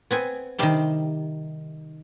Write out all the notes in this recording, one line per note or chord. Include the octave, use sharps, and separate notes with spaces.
B3 C4 G#5
C3 D#3 G3 A5 C6